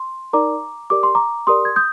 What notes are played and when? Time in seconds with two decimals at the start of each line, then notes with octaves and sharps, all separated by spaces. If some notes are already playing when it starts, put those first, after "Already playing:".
Already playing: C6
0.33 D#4 A#4 D5 A#5 D6
0.90 G4 A#4 D5 D6
1.03 C6
1.15 A#5 D6
1.47 G4 A#4 D5 C6 D#6
1.65 G#6
1.76 D#6 G6